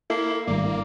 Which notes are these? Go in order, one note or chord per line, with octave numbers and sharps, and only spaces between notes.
A#3 E4 A4
G#1 G2 A#3 D5